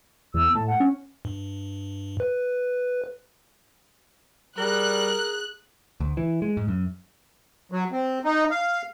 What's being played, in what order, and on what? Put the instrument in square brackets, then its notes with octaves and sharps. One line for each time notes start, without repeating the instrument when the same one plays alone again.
[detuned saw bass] E2 [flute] E6
[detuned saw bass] A2 [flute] A5
[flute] F#5
[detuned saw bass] C#4
[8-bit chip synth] G2
B4
[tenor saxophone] G3 [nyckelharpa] G#4 [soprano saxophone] A#4 [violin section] F#6
[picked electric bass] D2
E3
G#3
G#2
F#2
[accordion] F#3
C4
D#4
F5